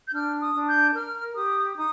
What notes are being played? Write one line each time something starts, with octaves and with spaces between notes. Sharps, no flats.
G6
D4 F6
D#6
D4
G6
A#4 F6
G4 D#6
D#4 D#6